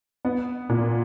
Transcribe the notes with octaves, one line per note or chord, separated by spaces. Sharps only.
B3
A#2